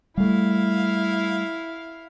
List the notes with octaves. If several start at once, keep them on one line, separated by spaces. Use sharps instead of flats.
G3 A3 E4 F5